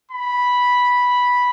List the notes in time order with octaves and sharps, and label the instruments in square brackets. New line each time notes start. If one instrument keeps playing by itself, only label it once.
[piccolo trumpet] B5